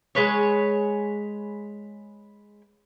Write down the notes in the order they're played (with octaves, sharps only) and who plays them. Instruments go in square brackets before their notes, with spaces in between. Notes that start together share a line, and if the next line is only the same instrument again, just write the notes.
[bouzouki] G#3 B4 C#5